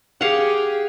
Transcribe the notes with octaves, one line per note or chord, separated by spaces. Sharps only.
G4 G#4 F5 F#5